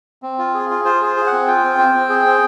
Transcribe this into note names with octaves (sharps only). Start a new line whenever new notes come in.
C4
F4
G#4
F4
F4 C5
G#4 C5
G#4
F#5
C4
F4 G5
C4
C4
C4
G#4
C4